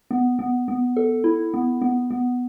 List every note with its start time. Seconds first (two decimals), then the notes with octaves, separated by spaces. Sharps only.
0.11 B3
0.39 B3
0.68 B3
0.97 A4
1.24 E4
1.54 B3
1.82 B3
2.11 B3